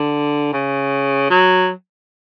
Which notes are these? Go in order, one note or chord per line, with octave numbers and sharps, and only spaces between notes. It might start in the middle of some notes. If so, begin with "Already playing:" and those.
Already playing: D3
C#3
F#3